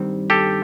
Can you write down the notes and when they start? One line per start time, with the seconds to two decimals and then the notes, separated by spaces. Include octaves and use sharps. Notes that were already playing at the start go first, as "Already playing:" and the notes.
Already playing: G2 D#3 G3 C4
0.30 G4 A4